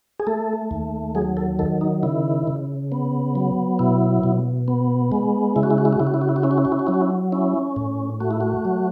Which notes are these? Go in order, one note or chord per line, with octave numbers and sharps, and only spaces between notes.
G#4
A3 A4
D#2
F#3 G#4
A4
D#3 A4
D#4
C#3 E4
C#3
B3
F#3
B2 E4
B2
B3
G#3
C#3 E4
F#4
E4
F#4
E4
F#4
C#3 E4
F#4
E4
F#4
E4
F#4
C#4 E4
F#4
E4
F#4
E4
F#4
F#3 E4
F#4
E4
C#4 E4
A2
A3 F#4
E4
F#4
F#3